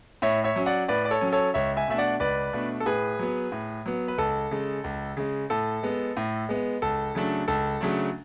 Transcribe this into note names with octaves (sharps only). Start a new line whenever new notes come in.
A2 C#5 E5
C#5 E5
F#3 C#4
D5 F#5
A2 B4 D5
D5
A4 C#5
F#3 C#4
A4 C#5
C#2 C#5 E5
E5 G#5
B2 A3 D4 E5
D5 F#5
C#2 B4 D5
B2 A3 D4
A4
A2 G#4 B4
F#3 B3
A2
F#3 B3
B4
C#2 A4
C#3 G#3
C#2
C#3 G#3
A2 A4
G#3 B3
A2
G#3 B3
C#2 A4
C#3 F#3 A3 D4
C#2 A4
C#3 F#3 A3 D4